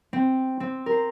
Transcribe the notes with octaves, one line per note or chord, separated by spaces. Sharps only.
C4
C4
A#4
C5